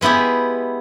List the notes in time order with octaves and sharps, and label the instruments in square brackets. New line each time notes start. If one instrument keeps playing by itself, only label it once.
[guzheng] G#3 B3 E4 G4 G#4